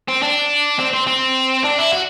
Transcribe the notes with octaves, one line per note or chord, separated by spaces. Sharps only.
C4
D4
C4
C4
C4
D4
E4
F#4